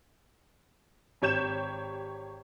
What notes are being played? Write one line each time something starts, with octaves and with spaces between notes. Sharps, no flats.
G#1 G4 C#5 G6 E7